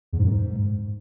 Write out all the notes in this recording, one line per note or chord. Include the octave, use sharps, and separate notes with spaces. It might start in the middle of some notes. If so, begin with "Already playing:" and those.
E2
G#2
F#2
G#2